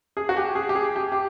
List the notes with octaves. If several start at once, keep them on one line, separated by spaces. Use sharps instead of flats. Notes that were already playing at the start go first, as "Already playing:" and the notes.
G#4
F#4
G4
G#4
G4
G#4
G4
G4